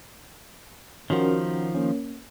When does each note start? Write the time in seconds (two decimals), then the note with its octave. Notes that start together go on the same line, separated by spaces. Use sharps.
1.10 D#3 F3 C#4 F#4 A#4
1.75 A#3 C#4